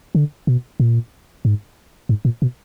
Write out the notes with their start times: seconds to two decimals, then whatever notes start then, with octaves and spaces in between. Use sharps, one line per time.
0.15 D3
0.47 B2
0.80 A#2
1.45 G#2
2.09 G#2
2.25 A#2
2.42 B2